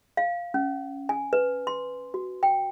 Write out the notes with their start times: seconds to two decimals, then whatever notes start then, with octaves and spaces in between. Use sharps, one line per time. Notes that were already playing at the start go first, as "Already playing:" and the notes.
0.17 F5
0.54 C#4
1.09 G#5
1.33 B4
1.67 C6
2.14 F#4
2.43 G5